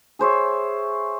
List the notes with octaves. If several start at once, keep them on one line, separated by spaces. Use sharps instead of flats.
G#4 C5 C#5 E5